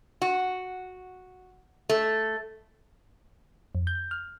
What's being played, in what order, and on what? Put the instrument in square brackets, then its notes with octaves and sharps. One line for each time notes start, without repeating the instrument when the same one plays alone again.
[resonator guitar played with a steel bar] F#4
A3
[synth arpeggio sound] F2
G6
F6